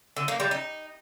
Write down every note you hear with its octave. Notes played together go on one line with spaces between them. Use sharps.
D3
A#3
G3
D#4